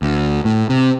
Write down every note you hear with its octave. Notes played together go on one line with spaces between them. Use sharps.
D2
A2
C3